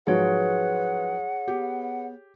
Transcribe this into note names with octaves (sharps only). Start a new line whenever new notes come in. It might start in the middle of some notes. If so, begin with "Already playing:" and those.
G#2 F3 F#3 G#4 B4 C#5 F#5
B3 G4